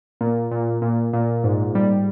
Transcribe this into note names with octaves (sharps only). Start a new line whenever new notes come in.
A#2
A#2
A#2
A#2
G#2
G3